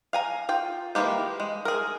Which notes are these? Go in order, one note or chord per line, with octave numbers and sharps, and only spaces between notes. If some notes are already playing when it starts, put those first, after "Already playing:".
F5 G#5 A#5
F4 G5
E3 F#3 G#3 A#3 G4
G#3
G#4 A#4